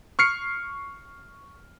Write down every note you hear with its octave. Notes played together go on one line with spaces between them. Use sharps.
C#6 F6 C7 C#7